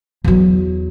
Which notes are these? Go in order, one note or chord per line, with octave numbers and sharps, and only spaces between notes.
E2 F#3